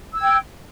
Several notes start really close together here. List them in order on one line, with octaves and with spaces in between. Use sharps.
E6 G#6 G5